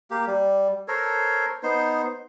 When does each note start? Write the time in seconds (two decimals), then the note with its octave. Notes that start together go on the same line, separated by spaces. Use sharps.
0.11 A#3 G4
0.27 G3
0.88 A4 A#4 C5 C#5
1.63 B3 D#4 C5